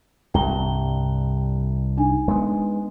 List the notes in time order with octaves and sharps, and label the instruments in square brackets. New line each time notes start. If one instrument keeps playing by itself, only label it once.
[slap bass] C2 G2 [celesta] G5 A#5 G7
[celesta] D4 D#4 G#5
[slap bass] G#3 B3